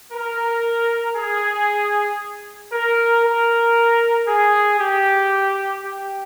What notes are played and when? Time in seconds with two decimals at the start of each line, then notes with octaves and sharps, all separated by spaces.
0.12 A#4
1.17 G#4
2.72 A#4
3.24 A#4
4.28 G#4
4.79 G4
5.84 G4